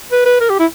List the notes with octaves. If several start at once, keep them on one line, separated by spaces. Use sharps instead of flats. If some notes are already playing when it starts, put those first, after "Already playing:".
B4
B4
A#4
G4
E4